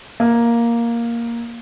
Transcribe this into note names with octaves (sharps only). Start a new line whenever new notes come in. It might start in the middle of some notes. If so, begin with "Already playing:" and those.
A#3